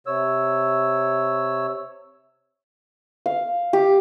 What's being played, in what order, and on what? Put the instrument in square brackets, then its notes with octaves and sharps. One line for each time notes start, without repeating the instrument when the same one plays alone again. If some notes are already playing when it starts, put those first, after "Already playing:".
[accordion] C3 C#5 E6
[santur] F5
G4